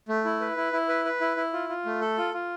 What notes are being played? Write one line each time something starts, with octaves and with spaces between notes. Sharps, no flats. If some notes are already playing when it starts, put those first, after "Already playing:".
A3
E4
B4
E4
E4
B4
B4
E4
E4
F4
F4
A3
A4
F4
F4